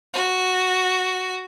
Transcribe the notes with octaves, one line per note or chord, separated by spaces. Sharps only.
F#4